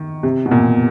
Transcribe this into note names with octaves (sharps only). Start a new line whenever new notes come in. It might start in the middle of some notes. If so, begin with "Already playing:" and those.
Already playing: D#3
C3
B2
A#2